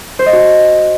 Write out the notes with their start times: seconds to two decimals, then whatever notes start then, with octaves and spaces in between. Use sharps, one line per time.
0.19 C5
0.26 D#5
0.33 F#4